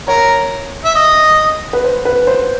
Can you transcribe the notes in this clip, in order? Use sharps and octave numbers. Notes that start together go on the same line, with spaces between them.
A#4 C#5
E5
D#5
B4
C5
B4
C5